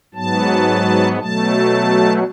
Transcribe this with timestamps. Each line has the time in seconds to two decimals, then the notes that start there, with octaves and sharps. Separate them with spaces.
0.14 G#2 F#3 B3 A5
1.19 B2 F#3 A3 A5